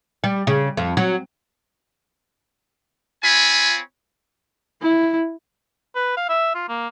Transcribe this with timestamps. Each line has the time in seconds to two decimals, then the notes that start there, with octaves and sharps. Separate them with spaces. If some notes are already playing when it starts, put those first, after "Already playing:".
0.24 G3
0.47 C#3
0.77 F2
0.97 F#3
3.22 C4 F4 C#5 G#5 B5
4.82 E4
5.95 B4
6.17 F5
6.29 E5
6.55 F4
6.69 A#3